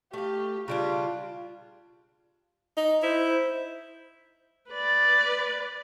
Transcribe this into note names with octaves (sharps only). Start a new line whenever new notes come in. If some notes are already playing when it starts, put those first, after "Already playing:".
A3 G4 F5
C#3 G3 D4 F4
D#4
E4 C5
B4 D5